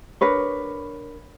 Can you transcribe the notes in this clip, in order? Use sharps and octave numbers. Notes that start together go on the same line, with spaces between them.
D4 A#4 B4 C#5